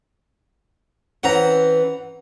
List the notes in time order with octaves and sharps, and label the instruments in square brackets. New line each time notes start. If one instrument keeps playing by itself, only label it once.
[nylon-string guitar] E3 C4 C#4 [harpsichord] F#5 A#5